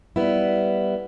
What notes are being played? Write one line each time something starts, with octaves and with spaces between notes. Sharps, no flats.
G3 B3 E4